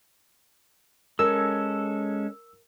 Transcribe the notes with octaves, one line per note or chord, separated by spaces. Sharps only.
G#3 C#4 A4 A#4 E6